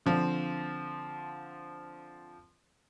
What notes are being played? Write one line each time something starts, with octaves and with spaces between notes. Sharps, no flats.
D3 F3 C4